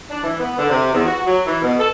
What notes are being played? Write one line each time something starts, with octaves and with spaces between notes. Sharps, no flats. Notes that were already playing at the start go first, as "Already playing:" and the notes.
D4
E3
B3
D3
C3
E2
F#4
F#3
E3
B2
A4